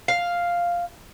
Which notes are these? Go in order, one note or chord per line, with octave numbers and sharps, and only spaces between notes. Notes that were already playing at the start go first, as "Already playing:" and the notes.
F5